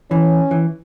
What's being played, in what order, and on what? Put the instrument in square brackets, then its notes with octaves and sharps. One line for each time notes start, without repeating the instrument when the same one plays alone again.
[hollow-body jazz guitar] E3 [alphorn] C#4
[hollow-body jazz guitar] E3